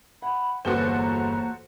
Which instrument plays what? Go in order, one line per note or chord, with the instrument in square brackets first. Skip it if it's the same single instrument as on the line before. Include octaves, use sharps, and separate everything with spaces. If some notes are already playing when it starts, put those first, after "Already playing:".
[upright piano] F#5 [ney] B5
[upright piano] G1 E2 G7 [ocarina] A#3 [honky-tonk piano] F#4 A4 C5 [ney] B4
[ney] A#5